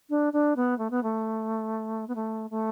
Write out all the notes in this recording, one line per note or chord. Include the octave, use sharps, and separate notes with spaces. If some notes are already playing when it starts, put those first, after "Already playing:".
D4
D4
B3
A3
B3
A3
B3
A3
A3